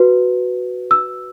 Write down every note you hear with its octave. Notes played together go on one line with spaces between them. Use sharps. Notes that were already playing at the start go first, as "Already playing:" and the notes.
Already playing: F#4 B4
E6